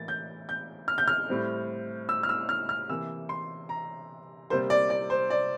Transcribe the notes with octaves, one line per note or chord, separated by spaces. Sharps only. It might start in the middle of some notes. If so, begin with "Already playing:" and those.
Already playing: A2 E3 A#3 A6
G6
G6
F6
G6
F6
A2 G3 C4
E6
F6
E6
F6
F6
C3 E3 A#3 E6
C6
A#5
C3 G3 A#3 C5
D5
D5
C5
D5